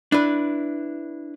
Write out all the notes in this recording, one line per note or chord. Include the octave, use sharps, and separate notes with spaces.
D4 E4 B4